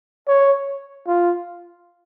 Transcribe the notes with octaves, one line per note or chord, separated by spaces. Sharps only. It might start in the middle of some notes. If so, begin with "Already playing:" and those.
C#5
F4